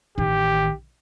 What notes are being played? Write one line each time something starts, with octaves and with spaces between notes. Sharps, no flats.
A1 D#3 G4